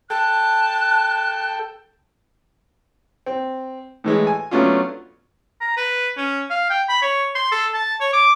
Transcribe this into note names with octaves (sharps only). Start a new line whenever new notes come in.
A4 G5 A5 F#6
C4
A2 E3 G#3
G#5
F#3 A3 B3 C#4 D4 F4
A#5
B4
C#4
F5
G5
B5
C#5
C6
A4
A5
C#5
D6